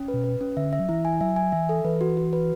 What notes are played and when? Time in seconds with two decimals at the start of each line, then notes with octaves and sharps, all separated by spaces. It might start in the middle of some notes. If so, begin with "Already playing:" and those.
Already playing: C#4
0.08 B4
0.14 B2
0.24 B4
0.41 C#4
0.57 D3 E5
0.73 E5
0.79 F#3
0.89 E3 E4
1.05 G#5
1.21 F#3 E5
1.36 G#5
1.52 E3 E5
1.69 A4
1.85 E3 B4
2.01 F#4
2.17 F#4
2.33 B4